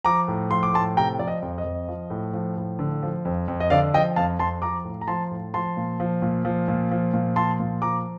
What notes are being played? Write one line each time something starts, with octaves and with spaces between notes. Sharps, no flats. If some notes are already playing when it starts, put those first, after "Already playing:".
F3 A#5 D6
A2
F3 C6
D6
A2 A5 C6
C3 G5 A#5
F3 D5
D#5
F2
D#5
F2
F3
A2
F3
A2
D3
F3
F2
F2
D#5
D3 D5 F5
F3 D#5 G5
F2 F5 A5
F2 A5 C6
F3 A#5 D6
A2
A#5
F3 A5 C6
A2
F3 A5 C6
A#2
F3
A#2
F3
A#2
F3
A#2
F3 A5 C6
A#2
F3 A#5 D6